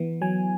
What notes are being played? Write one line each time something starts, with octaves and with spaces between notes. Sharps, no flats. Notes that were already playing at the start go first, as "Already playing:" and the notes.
Already playing: E3 B3
F#3 G#5